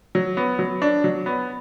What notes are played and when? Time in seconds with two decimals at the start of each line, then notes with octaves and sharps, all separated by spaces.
0.15 F#3
0.37 B3
0.59 F#3
0.82 D4
1.04 F#3
1.26 B3